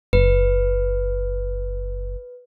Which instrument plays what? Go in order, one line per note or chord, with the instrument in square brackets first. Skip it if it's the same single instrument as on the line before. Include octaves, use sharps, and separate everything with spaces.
[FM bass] F#1 [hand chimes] B4